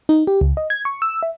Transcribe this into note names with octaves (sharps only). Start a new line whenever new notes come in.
D#4
G4
C#2
D#5
G#6
C#6
E6
E5